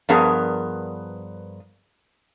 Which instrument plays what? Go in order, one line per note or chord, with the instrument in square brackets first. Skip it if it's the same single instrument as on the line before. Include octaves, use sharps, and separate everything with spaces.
[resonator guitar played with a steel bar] G2 F3 B3 G#4 A#4 A5